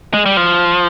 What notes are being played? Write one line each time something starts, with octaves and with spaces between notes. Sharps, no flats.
G#3
G3
F3